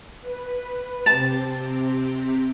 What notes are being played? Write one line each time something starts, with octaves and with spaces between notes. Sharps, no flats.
B4
C3 C4 G4 A5